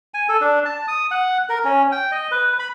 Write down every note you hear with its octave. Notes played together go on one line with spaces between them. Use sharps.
G#5
A4
D4
A5
D#6
F#5
A#4
C#4
G5
D#5
B4
B5